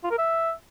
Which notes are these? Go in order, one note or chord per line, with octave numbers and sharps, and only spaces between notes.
F4
A#4
E5